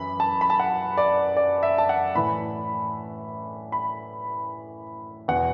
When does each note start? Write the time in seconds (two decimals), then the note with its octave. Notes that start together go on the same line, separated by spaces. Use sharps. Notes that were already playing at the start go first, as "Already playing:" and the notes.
Already playing: F#2 E3 B5
0.20 A5
0.41 B5
0.50 A5
0.60 F#5
0.97 D5
1.37 D5
1.63 E5
1.78 A5
1.89 F#5
2.15 A2 E3 B5
3.72 B5
5.28 E2 B2 F#5